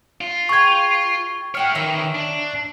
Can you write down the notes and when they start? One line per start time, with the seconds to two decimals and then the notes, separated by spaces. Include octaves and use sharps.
0.21 F4
0.49 G#4 G5 C#6 G#6
1.55 E4 F#4 C#5 G5 F6
1.75 D#3 E3 A#4 C#5 E5
2.15 D4